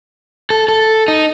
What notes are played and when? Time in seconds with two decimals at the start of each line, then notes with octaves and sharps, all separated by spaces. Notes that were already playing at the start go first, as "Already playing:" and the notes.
0.50 A4
0.68 A4
1.08 D#4